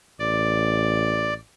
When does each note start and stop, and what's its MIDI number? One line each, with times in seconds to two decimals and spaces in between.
0.19 1.37 33
0.19 1.34 74